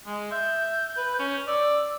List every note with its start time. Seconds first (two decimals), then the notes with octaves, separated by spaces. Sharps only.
0.06 G#3
0.32 E5 G6
0.97 B4
1.19 C#4
1.48 D5 E6